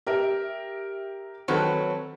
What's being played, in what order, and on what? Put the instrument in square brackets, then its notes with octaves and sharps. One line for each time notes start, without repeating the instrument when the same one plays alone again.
[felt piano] G4 A#4 E5
[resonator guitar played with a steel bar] D#3 F#3 B4 [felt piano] C4 A4